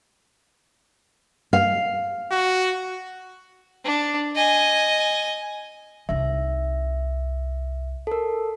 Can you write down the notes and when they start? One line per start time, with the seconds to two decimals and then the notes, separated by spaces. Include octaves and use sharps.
1.53 F5
2.31 F#4
3.85 D4
4.36 D#5 G#5
6.09 C2 D#4 E5
8.07 A4 A#4